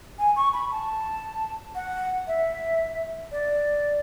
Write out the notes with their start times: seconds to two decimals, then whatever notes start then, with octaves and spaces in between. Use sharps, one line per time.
0.19 G#5
0.36 C#6
0.53 B5
0.71 A5
1.75 F#5
2.27 E5
3.32 D5